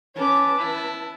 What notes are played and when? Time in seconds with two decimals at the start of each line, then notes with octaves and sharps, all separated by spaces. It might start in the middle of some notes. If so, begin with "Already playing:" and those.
0.16 C#4 B4 A5 D6
0.59 E4